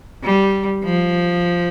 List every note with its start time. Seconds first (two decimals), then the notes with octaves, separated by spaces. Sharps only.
0.24 G3
0.84 F3